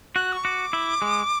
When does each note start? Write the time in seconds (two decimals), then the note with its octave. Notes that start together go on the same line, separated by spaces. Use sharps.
0.16 F#4 F#6
0.33 C#6
0.44 F#4 D6
0.73 E4
1.02 G#3